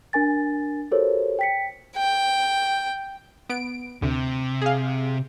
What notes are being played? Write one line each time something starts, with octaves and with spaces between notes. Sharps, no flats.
D4 A#4 G#5 A6
F#4 G4 A4 A#4 C5 C#5
G5 B6 C#7
G5
B3 D7
D2 C3
G#4 F5